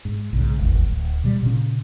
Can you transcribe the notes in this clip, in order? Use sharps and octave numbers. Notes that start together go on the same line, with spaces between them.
G#2
B1 G#2 C#3
D1 G#1 E2
D1
B2 F#3 G3
A#2 C#3 C#4